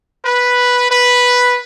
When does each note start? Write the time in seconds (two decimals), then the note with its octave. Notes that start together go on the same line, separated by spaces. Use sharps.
0.25 B4
0.90 B4